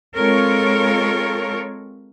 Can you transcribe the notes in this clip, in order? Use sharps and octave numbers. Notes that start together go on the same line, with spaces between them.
G#3 C4 F4 A4 A#4 C#5